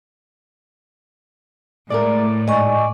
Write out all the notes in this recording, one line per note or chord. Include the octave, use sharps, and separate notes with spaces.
A2 G#3 A3 A#4 D5
G#2 D#5 F#5 G#5 C#6